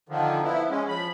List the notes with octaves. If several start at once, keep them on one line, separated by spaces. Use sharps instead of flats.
D3 D#3 F3
F3 B3 E4
G#3 C#4
F3 B5